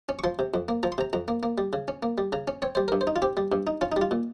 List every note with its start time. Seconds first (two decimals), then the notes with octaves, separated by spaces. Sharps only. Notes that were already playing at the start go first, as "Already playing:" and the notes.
0.09 C#4
0.19 C#6
0.24 F3 C6
0.39 C3
0.54 F2
0.68 A#3
0.83 F3 A#5
0.92 C6
0.98 C3 A#5
1.13 F2 A#5
1.28 A#3
1.43 A#3
1.58 G3
1.73 C#3
1.88 C#4
2.03 A#3
2.18 G3
2.32 C#3 A#5
2.48 C#4
2.62 C4 C#5
2.75 G3 C5
2.88 G2 A#4
3.01 C5
3.07 D#4
3.16 F4
3.22 C4 G4
3.37 G3
3.52 G2
3.67 D#4
3.81 C#4 F4
3.92 G3 D#4
4.01 F4
4.11 A#2